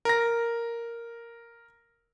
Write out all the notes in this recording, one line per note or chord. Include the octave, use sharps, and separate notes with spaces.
A#4 A#6